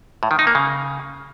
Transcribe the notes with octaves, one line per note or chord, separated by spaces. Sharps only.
A2
D#3
D#4
A#3
C#3